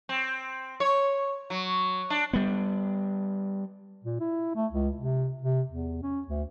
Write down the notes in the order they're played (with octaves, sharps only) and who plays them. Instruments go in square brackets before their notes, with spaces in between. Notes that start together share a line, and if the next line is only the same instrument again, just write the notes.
[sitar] C4
C#5
F#3
D4
[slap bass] G3 B3
[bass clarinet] A#2
E4
A3
C#2
C3
C3
E2
C#4
D2